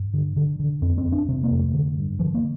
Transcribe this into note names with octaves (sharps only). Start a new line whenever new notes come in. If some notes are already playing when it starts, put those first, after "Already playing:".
Already playing: G2
D3
D3
D3
F2 C4
C4
F2
D4
C3 C4
A#3
F2
A3
D3
G2
D3 F3
A#3